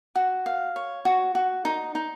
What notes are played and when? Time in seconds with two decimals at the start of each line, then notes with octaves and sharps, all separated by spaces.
0.16 F#4
0.46 F5
0.76 C#5
1.05 F#4
1.35 F#4
1.65 D#4
1.95 D#4